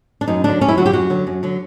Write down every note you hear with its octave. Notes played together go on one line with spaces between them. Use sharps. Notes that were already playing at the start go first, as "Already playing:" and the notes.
D4
F#2 D#4
D3 F#3 D4
F#2 C#4
E4
D3 F#3 F#4
G4
F#2 F#4
D3 F#3
F#2
D3 F#3